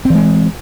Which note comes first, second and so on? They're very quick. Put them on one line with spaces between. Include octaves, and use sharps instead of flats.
C4 E3 G#3